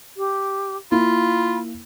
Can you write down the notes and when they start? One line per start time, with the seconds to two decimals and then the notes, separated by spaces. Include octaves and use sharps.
0.17 G4
0.92 A#3 E4 F4 B5